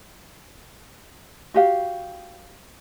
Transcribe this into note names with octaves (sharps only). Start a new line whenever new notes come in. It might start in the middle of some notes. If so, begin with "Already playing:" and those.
F#4 G4 F5